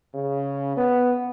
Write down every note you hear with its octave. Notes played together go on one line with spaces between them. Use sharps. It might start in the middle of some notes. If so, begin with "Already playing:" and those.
C#3
B3